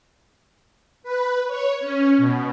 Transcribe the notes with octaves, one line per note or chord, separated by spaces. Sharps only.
B4
C#5
C#4
B2